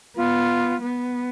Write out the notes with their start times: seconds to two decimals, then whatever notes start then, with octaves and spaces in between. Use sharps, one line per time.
0.16 B3 F4
0.82 B3